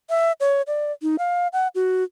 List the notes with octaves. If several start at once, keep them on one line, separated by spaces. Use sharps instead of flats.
E5
C#5
D5
D#4
F5
F#5
F#4